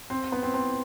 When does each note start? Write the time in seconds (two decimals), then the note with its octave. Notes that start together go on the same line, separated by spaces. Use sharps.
0.10 C4
0.32 B3
0.43 C4
0.54 C4